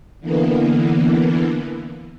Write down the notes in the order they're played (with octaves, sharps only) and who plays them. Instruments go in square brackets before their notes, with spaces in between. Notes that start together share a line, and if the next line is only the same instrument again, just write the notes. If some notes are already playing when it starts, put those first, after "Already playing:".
[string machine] D3 E3 A#3 B3